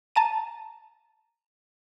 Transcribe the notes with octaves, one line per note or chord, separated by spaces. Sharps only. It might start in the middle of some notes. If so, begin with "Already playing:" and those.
A5 A#5 D#7